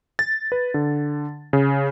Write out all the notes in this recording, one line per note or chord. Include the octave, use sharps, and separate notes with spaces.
A6
B4
D3
C#3